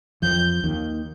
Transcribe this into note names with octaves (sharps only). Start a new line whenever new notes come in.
F2 F3 G6
D#2 D#3